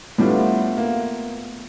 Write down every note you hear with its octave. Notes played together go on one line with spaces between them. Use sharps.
A2 G3 A3 B3 D4 F4
A#3